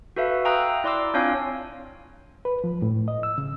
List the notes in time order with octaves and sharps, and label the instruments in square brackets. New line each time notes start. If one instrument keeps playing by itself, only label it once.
[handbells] F#4 A4 B4 E5 F5
F5 G5 A#5 D#6 E6 F#6
E4 D5 C6 D6 E6
C4 D4 F4 C#5 F5 G#5
[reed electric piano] B4
F3
A2
D#5
E6
C#3